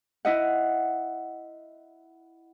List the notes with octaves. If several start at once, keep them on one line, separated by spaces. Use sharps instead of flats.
E4 D#5 F#5